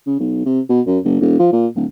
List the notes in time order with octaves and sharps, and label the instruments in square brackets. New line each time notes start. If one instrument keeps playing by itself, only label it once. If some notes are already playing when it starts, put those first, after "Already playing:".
[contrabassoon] C#3
B1
C3
B2
F#2
F#1
E1
F3
A#2
D1